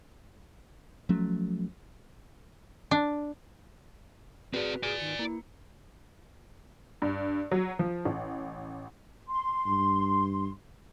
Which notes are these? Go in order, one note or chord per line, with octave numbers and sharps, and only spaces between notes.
F3 F#3 A3 C#4
D4
C4 F#4 G#4 B4 D5
G#4 D5 G#5
D#3 C#7
A#3 E4
G2
F#3
F3
A1
C6
G2